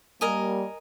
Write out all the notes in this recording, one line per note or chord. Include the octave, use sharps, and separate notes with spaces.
G3 A#3 A#4 D#5 G#5